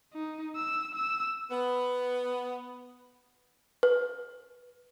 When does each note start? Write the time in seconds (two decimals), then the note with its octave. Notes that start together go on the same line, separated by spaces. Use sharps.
0.13 D#4
0.56 E6
0.95 E6
1.51 B3
3.83 B4